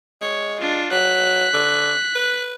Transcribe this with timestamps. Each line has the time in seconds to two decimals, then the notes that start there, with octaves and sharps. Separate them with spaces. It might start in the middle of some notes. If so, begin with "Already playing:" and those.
0.22 G#3 C#5
0.60 D4 F4
0.92 F#3 F#6 B6
1.54 D3
2.15 B4